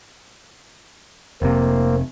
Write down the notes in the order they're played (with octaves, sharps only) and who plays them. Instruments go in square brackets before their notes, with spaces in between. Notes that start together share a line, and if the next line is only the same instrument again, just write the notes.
[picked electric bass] F1 C3 [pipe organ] A#3 C4